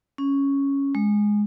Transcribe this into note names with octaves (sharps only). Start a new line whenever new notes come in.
C#4
G#3